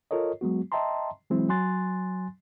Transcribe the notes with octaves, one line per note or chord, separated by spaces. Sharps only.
F4 A4 A#4 C#5 D#5
F#3 G#3 B3 F#4
D#5 E5 G5 A5 A#5 C6
E3 F#3 G#3 C4 E4
F#3 G#5 C6 F#6 A6